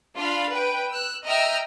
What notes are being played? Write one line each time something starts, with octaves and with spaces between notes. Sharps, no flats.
D4 F4 F5 B5
B4 G5
E6 F#6
D#5 E5 G5 A#5 E6 F6